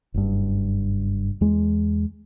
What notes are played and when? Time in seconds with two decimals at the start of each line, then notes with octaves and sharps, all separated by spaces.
0.14 F#1 G2
1.41 E2 G#3